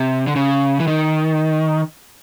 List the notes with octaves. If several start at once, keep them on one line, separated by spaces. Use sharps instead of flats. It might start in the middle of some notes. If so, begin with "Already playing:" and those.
Already playing: C3
D3
C#3
E3
D#3